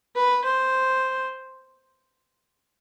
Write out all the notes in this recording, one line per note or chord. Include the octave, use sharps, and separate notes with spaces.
B4
C5